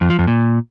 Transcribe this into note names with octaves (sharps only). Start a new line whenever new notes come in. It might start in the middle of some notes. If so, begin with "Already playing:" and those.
F2
F3
F2
A#2